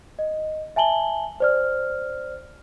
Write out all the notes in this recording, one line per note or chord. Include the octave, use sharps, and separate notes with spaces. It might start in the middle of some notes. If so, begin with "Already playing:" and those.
D#5
E5 G#5 A5 F#7 G7
C5 D5 F6